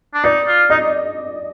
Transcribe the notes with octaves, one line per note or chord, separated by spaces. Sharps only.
D4
D#4 D5
F4
D#4 D#5